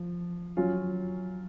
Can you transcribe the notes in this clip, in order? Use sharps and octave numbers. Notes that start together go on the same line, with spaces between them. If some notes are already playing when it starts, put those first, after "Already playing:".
Already playing: F3
F#3 C#4 F4